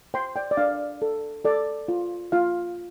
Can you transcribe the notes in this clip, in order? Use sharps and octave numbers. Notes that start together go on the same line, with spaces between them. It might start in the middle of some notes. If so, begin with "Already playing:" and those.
C5 G5 C6
D5 G5
D5
D4 F5
A4
A4 D5
F4
F4 F5